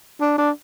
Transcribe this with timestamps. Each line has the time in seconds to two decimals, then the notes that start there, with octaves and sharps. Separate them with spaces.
0.21 D4
0.38 D4